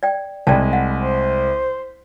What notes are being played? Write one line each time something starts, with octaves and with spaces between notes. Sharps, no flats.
D5 G5
C2 G#3 D5 G5 A5
F#5
C5